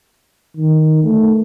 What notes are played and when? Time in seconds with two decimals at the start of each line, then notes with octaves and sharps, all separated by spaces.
0.57 D#3
1.04 A3